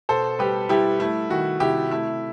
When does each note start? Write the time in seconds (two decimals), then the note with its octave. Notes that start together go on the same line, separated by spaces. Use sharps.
0.09 B2 A4 C5
0.39 G3 G4 B4
0.69 G3 E4 G4
1.00 A3 E4
1.30 D#3 F#4
1.60 C3 E4 G4
1.91 A3 E4